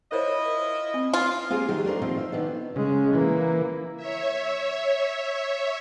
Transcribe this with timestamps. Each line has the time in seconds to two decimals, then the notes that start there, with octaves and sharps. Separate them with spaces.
0.12 E4 F4 A#4 C5 C#5 D#5
0.94 C4
1.14 F4
1.50 C4 F4 G4 G#4 A#4
1.68 D#3 F#3 G4
1.85 A3 D4 A#4 C5
2.01 D#3 F3 C4 F4
2.17 E5
2.32 D#3 B3 D4
2.76 C#3 G#3
3.15 E3 A#3
3.96 C#5 E5